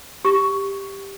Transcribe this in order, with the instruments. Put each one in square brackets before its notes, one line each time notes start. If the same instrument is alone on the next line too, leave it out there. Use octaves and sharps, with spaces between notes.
[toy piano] G4 C#6